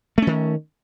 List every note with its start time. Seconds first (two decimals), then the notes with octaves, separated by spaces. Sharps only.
0.18 A3
0.22 C#4
0.27 D#3